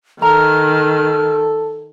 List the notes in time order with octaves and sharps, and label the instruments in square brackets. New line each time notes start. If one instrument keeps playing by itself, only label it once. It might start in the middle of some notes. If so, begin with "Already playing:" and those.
[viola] D#3 [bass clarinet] A4 [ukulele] A#5 [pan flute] F6